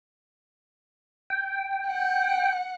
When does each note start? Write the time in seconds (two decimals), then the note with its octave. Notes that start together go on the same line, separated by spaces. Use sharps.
1.30 G5
1.87 F#5